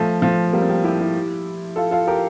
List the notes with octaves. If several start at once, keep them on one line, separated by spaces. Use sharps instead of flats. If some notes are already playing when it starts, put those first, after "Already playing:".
Already playing: F3 A3
F3 A3
G3 A#3
C4
G3 A#3
E4 G4
E4 G4
F4 A4
F4 A4
G4 A#4